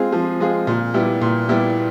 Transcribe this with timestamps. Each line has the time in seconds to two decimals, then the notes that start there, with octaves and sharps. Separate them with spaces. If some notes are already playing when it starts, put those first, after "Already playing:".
Already playing: G#3 C4 F4 G#4
0.12 F3
0.40 G#3 C4 F4 G#4
0.67 A#2
0.94 G3 B3 E4 G4
1.21 A#2
1.49 G3 B3 E4 G4